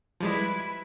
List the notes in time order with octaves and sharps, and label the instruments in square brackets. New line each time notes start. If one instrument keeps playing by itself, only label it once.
[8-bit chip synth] F3 G3 G#3 [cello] E4 B4